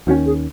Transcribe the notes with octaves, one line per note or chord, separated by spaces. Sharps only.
D#2 D#3 A3 C#4 F#4
G#4